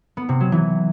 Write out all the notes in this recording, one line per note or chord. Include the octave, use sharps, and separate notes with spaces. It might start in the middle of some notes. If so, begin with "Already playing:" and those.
B3
C3
F#3
E3